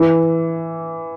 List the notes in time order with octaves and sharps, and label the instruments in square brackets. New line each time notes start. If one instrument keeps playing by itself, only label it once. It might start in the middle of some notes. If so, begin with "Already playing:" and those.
Already playing: [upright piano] E3